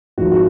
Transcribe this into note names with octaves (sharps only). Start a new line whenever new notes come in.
G#1 G#2 F3 F#4
F#4